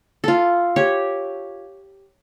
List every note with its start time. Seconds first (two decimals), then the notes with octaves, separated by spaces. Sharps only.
0.24 F4 A4
0.76 G4 C#5